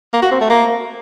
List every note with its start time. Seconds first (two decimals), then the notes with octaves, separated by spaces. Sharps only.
0.13 A#3
0.22 F#4
0.32 C4
0.41 A3
0.50 A#3